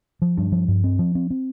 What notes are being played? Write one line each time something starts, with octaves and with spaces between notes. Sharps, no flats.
F3
G2
F3
G2
C4
F3
C4
C4